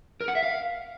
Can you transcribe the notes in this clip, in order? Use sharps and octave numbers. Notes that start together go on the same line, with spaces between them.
A#4
F#5
E5
F5